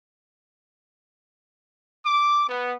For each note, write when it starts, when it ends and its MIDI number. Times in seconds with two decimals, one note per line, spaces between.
2.05 2.44 86
2.48 2.75 59